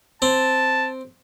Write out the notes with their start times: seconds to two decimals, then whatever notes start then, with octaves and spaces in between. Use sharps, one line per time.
0.22 C4 A5